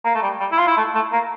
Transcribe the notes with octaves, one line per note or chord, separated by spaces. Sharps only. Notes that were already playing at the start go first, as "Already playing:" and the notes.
A#3
A3
G3
G3
E4
F4
E4
A3
A3
A#3